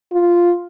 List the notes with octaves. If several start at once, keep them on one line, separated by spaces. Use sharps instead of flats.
F4